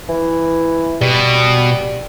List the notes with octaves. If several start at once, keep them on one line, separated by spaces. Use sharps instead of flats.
E3
B2 G3